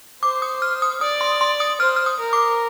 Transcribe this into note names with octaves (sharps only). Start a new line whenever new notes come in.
C5 D6
D#6
F6
D#6
D5 D#6
C6
C6
D#6
C5 F6
F6
D#6
A#4
D6